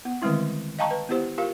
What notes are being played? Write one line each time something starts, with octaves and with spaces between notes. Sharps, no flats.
B3
D3 D#3 G3 G#3 C4 E4
D#5 F5 G5 A5 A#5 C#6
B4
B3 E4 G4 C5
F4 G4 A#4 F5